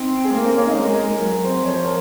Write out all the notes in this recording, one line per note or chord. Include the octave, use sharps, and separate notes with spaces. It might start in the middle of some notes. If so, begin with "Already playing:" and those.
Already playing: C4 D#4
G#4
A#3 A#4
C4 C5
C#4 C#5
D#4 D#5
G#3 A#4
G#4
A#4
F#3 A#4
C4 C5
F3 C#5
C5
A#4